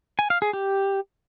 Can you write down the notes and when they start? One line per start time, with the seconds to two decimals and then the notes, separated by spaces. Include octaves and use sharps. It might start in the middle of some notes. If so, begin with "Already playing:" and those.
0.19 G#5
0.30 F5
0.42 G#4
0.53 G4